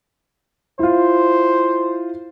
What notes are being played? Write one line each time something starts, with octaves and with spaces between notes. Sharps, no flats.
E4 F4 C5